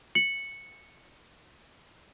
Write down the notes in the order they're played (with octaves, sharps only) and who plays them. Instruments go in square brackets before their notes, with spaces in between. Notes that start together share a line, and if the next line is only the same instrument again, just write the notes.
[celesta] C#7 F#7